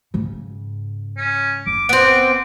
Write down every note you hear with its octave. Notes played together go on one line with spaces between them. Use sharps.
G#2 C#3
C#4
F#1 D6
B3 C4 D6